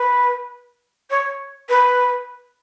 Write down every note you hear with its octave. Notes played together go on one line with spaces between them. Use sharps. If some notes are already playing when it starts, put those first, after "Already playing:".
Already playing: B4
C#5
B4